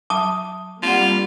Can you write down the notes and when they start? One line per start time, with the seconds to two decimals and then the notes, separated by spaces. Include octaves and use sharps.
0.10 F#3 E5 A5 D6 D#6
0.83 G3 A#3 C4 D4 F4 F#5